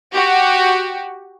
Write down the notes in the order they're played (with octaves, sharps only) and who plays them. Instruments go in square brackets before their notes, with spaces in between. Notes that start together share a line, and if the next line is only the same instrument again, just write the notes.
[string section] F#4 G4